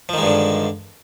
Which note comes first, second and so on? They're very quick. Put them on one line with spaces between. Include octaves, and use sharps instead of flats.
F3 D#3 G#3 G2 D3